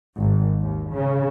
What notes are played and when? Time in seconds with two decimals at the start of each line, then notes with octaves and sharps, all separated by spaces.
0.18 G#1
0.60 D#2
0.91 C#3